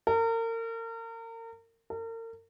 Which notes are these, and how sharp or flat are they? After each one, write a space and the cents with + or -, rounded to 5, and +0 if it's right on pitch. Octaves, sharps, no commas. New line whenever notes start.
A#4 -35
A#4 -40